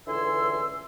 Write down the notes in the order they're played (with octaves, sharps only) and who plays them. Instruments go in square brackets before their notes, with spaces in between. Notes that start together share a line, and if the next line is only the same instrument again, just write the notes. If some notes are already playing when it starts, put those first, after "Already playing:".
[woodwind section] C#2 D3 E3 G#5 C6 E6